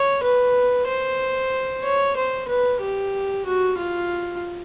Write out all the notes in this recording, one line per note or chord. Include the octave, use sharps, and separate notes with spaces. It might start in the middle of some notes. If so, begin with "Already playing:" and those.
Already playing: C#5
B4
C5
C#5
C5
B4
G4
F#4
F4